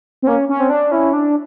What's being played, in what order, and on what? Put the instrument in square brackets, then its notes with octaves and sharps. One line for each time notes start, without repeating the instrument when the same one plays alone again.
[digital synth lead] C4
[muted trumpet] A#3 [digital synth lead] C#4
[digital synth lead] C#4
[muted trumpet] C4
[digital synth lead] D4
[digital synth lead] C#4 [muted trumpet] E4
[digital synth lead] D4